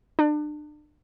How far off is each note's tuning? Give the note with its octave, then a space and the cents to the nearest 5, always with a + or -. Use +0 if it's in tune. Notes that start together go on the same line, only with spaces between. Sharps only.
D4 +35